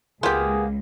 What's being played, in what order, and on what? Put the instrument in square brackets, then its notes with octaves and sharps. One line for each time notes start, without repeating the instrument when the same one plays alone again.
[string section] C#2 [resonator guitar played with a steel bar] A#3 B3 [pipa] F4 G4 [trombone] G#4